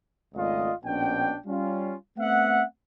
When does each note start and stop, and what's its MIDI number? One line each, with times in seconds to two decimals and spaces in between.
0.35 0.71 32
0.35 0.71 37
0.35 0.71 57
0.35 0.71 65
0.35 0.71 74
0.35 0.71 75
0.84 1.36 34
0.84 1.36 47
0.84 1.36 61
0.84 1.36 62
0.84 1.36 79
1.46 1.95 55
1.46 1.95 61
1.46 1.95 65
2.17 2.63 57
2.17 2.63 59
2.17 2.63 60
2.17 2.63 76
2.17 2.63 78